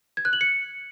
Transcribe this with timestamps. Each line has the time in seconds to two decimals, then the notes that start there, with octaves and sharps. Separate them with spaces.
0.17 G#6
0.25 F#6
0.33 F#7
0.41 C#7